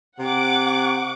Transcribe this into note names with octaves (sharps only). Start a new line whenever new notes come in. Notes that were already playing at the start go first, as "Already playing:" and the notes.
C3 F#5 D6